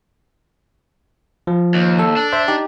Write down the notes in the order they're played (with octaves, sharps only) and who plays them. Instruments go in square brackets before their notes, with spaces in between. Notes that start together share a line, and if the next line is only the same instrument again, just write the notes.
[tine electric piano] F3
[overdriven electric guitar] D#2
[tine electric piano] A4
[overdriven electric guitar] D4
[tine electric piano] C5 E5
D#4 G4